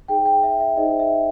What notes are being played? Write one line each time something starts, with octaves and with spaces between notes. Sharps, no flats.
D#4 G#4 C5 G5
G5
E5
E5
D#4 G#4 C5 D#5
E5